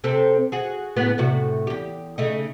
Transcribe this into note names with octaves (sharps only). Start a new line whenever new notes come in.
C3 C4 A4
F#4 G#4
A2 C#3 B3
A2 C3 F#4
E2 G4
C#3 A3 D#4